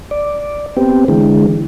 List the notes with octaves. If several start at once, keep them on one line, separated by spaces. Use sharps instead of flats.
D5
B3 C4 G4
D3 E3 G#3